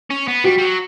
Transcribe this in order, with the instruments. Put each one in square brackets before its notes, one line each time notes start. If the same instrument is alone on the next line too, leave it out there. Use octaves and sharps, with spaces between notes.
[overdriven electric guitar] C#4
B3
[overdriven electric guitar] G3 [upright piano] F#4
[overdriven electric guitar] G3
F#3